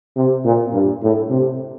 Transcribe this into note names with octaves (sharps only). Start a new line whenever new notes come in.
C3
A#2
G2
A2
C3